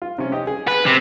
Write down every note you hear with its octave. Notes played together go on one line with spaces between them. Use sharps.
F4
C3 C#4
G4 D#5
G#4
B4
C3